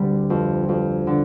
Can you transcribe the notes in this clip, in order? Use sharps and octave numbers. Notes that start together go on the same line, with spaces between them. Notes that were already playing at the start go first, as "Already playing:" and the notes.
Already playing: D2 D3 G3 C4
F2
F2
D3